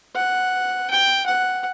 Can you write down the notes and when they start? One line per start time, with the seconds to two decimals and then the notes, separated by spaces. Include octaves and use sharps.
0.16 F#5
0.90 G5
1.26 F#5